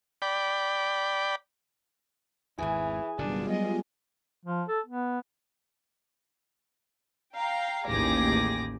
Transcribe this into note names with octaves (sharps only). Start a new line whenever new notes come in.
D5 G5 B5
G#1 E2 E3 G#4 G#5
F#1 B2 D#3 G3 B3 D4 F4
F#3 G#3 D#5
F3
A4
B3
F5 G5 A#5
A1 D#2 G4 G#4 D6 A#6